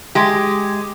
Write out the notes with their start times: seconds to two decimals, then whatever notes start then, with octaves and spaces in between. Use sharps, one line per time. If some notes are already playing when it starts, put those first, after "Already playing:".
0.15 G#3 G4